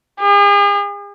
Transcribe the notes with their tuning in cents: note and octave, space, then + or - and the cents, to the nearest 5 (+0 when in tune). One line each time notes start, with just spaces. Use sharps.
G#4 -45